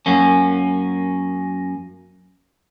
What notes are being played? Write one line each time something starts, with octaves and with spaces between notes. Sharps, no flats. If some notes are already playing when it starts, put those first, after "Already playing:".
F#2 A#3 C#4